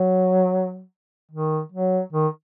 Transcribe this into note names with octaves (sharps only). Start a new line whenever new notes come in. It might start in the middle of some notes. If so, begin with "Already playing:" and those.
Already playing: F#3
D#3
F#3
D#3